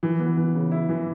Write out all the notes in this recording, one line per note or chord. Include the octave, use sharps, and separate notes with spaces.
E3
B3
E3
C#3
E4
E3